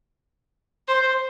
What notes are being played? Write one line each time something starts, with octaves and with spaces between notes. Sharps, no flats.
C5